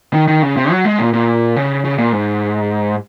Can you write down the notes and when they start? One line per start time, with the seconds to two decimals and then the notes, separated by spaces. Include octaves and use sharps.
0.13 D#3
0.28 D#3
0.43 C#3
0.57 C3
0.70 F#3
0.85 G#3
0.99 A#2
1.13 A#2
1.56 C#3
1.85 C#3
1.98 A#2
2.12 G#2